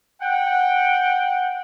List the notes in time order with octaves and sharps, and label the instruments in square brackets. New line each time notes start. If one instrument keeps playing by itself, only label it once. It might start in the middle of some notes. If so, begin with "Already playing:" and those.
[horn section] F#5 G5